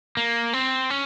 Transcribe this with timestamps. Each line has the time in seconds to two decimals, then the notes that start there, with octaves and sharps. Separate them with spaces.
0.17 A#3
0.53 C4
0.90 C#4